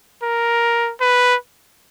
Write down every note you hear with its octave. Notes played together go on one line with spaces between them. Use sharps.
A#4
B4